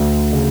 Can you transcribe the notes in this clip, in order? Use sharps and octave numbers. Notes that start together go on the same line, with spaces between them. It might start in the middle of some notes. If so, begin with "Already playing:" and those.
Already playing: D2
C#3